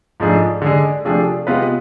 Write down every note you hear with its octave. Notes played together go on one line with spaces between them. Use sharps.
G#2 F3 A3 D4 G#4
D3 G#3 D4 G#4
C3 F3 A3 D4 G#4
C3 G#3 B3 F4 B4